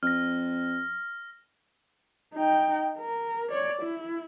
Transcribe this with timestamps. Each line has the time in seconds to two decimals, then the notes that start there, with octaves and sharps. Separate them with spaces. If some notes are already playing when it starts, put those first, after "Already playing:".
0.03 F2 F6 A#6
2.34 D#4 G5
2.99 A#4
3.50 C#5 D5
3.82 E4